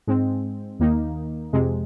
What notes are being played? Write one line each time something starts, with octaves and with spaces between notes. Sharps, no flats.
G#2 G#3 C4
D#2 D#3 A#3 D#4
F2 C3 G#3